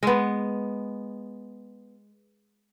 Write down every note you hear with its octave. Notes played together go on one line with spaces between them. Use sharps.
G#3 B3